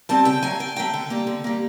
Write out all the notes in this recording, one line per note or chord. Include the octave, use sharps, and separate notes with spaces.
G3 C4 A5
C#3 G5
F#3 A3 G#5
C#3 G5
F#3 A3 G5
D3
G3 A#3
D3
G3 A#3